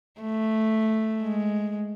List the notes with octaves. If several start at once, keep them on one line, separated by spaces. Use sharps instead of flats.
A3
G#3